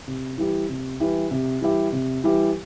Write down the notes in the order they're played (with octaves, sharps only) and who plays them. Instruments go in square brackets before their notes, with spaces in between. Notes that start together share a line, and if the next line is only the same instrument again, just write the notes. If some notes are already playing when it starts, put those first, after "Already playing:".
[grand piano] C3
E3 G3 E4 G4
C3
E3 G3 E4 G4
C3
E3 G3 E4 G4
C3
E3 G3 E4 G4